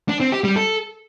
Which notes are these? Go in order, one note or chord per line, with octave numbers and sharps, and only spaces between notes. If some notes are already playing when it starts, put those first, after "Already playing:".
D4
C4
G4
G3
A4